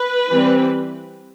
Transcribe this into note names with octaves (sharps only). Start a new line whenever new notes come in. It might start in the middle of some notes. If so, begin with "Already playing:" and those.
Already playing: B4
E3 G3 C4